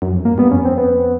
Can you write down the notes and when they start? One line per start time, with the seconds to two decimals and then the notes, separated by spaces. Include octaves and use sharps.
0.02 F#2
0.12 F2
0.25 G2 A#3
0.38 G2 B3
0.51 F2 C#4
0.65 C4
0.77 B3